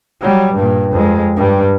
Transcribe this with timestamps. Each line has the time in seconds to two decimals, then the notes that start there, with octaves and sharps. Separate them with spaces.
0.21 F#3 G3
0.55 G2 A#2
0.92 F2 G#3
1.36 G2 G3